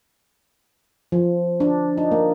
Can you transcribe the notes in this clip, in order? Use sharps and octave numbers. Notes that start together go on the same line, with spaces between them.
F3
D4
D#4
A#3